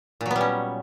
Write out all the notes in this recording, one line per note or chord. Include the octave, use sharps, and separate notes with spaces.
A#2 F#3 G3 B3 C#4